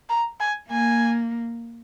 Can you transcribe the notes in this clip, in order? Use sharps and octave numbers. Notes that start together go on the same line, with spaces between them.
A#5
G#5
A#3 G#5